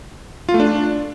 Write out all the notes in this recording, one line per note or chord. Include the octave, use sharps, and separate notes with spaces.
F4
A3
D4